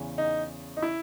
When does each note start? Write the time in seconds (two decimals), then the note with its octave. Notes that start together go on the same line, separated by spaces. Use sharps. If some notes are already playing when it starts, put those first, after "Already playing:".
Already playing: E2 C#3 E3
0.18 D#4
0.77 D#4
0.82 E4